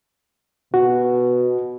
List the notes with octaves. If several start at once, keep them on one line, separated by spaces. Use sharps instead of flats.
B2 F#4